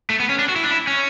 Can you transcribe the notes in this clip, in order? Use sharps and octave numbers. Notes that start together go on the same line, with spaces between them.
A3
B3
C#4
D4
F#4
E4
D4
E4
C#4